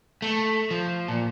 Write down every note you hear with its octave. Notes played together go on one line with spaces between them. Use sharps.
A3
F3
A#2